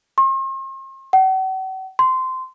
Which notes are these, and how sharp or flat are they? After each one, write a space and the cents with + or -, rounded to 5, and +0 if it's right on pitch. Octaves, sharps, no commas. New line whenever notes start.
C6 +45
F#5 +45
C6 -15